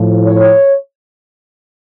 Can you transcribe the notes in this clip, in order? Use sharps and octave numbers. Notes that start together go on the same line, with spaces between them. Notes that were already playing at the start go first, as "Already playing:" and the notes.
Already playing: A2 F3
C#5